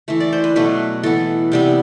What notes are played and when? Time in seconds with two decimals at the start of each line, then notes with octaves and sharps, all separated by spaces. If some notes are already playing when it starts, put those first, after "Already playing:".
0.08 E3 A3 E5
0.20 D5
0.33 C5
0.44 B4
0.56 B2 F#3 A3 B4
1.03 E3 B3 A4
1.52 C3 G3 B3